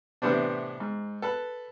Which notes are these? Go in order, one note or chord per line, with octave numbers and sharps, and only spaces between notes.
A2 C3 E3 B3 C4 D4
G#2
A4 B4